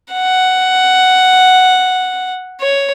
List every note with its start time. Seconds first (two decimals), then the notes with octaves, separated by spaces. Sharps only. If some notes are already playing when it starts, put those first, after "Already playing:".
0.13 F#5
2.61 C#5